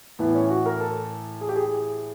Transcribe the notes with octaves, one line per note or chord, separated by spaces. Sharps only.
A2 E3 B3
C#4
F#4
A#4
A4
G#4
G4
G#4